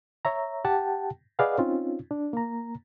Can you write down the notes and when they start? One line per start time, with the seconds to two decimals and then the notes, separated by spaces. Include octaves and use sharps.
0.25 C#5 E5 A#5
0.65 G4 F#5 G5 A5
1.39 G#4 B4 D5 D#5 F5 F#5
1.58 C4 C#4 D#4 F4
2.11 D4
2.33 A#3 A#5